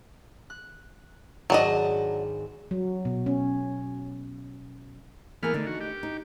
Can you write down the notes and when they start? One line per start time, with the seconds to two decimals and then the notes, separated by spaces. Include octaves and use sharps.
0.50 F#6
1.50 G#1 F#3 D4 D#5
2.71 F#3
3.05 B2
3.26 C#4
5.43 E3 A#3 B3 G#4 A#4 F6
5.54 D3 A3 D4 D#4
5.67 F#4
5.81 G4
6.03 D#4